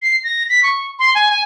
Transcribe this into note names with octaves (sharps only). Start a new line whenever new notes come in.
C7
A#6
B6
C#6
C6
G#5
G#5